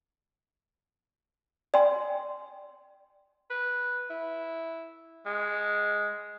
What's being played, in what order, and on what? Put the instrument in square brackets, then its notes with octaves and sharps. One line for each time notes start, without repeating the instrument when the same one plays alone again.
[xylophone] D5 G5 G#5 C6
[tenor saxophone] B4
E4
G#3